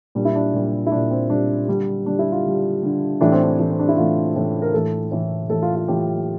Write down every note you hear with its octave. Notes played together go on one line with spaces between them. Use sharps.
A#2 G3 D4
E4
D4
A#2 G3
E4
A#2 G3 D4
C4
A#2 G3 D4
D3 G3
D3 G3 D4
E4
F4
D3 G3
D3 G3
A2 E3 A3 D4
C4
D4
A2 E3 A3
C4
D4
E4
A2 E3 A3 F4
A2 E3 A3
A#4
A2 E3 A3 A4
A2 E3 A3
A2 E3 A3 A4
F4
F4
A2 E3 A3 G4